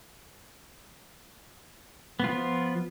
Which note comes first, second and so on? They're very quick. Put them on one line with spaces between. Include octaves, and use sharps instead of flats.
B3 F4 F3